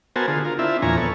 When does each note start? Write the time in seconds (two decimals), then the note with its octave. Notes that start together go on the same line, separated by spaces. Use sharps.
0.16 B3 F#4 A#4 C5 G#5 A5
0.28 D3 F4 G#4
0.45 F4 A#4
0.59 C4 D4 E4 F4 E5
0.82 E2 A#2 F3 C#5 G#5 A#5
0.97 B3 A4 C#5